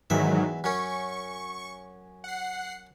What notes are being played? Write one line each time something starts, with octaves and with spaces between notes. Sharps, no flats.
E2 G#2 D#3 F#3 E5
F#2 C#4 C#6
F#5 C7